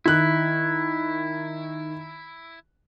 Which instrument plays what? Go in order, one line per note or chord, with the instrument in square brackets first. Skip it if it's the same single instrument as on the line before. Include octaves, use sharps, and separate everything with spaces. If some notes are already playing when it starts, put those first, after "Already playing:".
[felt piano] D#3 F#6 [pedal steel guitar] E4